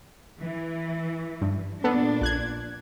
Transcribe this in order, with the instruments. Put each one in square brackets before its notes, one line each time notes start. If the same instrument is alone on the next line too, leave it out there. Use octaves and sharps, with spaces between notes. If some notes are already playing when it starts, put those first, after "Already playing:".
[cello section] E3
[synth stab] G2
[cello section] A#2 D4 [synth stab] B3 A4
[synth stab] A#1 F#6 G#6